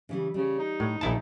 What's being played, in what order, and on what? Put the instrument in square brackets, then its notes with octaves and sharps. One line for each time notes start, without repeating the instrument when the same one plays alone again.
[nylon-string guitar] C#3 E3 G3
[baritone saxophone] C#3 [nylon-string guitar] G3
[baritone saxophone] D#4
[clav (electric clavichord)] A2
[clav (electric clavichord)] A#1 E4 A5 [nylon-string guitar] A#2 D#3